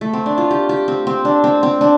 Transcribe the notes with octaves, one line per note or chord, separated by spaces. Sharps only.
A3
C4
D4
F4
G4
G4
C4
C4
D4
C4
C4
D4